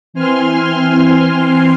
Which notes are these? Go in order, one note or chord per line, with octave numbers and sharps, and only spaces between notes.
E3 C4 G#5 C6 F6